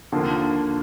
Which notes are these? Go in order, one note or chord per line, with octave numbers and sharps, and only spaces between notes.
D#2 D3 F3 A#3 F4